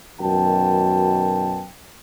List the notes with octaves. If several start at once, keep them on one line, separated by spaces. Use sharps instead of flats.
F#2 B2 D#3 G5 A5